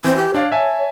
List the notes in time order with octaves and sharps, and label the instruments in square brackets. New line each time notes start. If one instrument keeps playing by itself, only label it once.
[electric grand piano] E3 [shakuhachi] C4
[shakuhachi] G4
[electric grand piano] D4 D5 F5 [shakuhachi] C#5
[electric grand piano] E5 G#5 A5